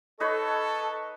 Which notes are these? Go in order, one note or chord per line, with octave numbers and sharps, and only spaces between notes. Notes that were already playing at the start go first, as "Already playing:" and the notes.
D#4 A4 B4 C#5 D#5 C#6